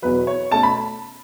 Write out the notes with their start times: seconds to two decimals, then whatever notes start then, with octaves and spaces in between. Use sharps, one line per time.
0.02 E2 B2 F#3 B4
0.27 C#5
0.52 B2 A3 C#4 A5
0.63 B5